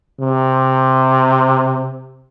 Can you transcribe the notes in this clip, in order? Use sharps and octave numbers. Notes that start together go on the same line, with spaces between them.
C3